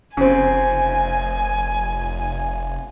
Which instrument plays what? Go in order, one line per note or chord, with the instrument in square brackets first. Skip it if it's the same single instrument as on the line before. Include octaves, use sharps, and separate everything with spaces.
[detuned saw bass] F1 [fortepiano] C#3 C4 [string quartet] G#5